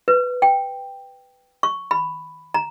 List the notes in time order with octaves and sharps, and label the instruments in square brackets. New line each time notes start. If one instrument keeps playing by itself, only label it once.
[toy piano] B4
G5
C#6
B5
A#5